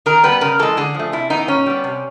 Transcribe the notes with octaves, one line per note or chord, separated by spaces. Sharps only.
D#3 A#4
G3 B3 B4
C#3 A#4
E3 G#3 A4
D3 G#4
F3 A3
C3 E4
E3 G#3 B3 D#4
A#2 C#4
G3 B3
C3